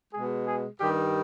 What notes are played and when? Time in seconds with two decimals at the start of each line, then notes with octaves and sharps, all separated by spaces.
0.13 B2 G#3 G#4
0.46 G#4
0.80 G2 D#3 G3 G4